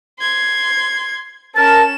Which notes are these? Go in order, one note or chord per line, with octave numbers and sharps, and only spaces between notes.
C6 G#6
C#4 A#4 A5 E7